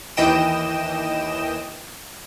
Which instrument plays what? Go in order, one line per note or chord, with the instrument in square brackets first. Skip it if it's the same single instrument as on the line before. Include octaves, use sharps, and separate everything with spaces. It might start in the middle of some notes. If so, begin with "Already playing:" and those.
[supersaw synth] D#2 E3 D#5 G5 E7